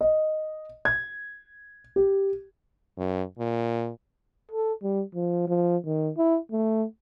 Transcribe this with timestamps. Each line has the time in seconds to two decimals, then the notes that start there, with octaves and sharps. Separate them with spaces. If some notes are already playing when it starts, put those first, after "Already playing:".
0.01 D#5
0.85 G#6
1.96 G4
2.97 F#2
3.39 A#2
4.51 A4
4.83 G3
5.15 F3
5.47 F3
5.86 D#3
6.17 E4
6.52 A3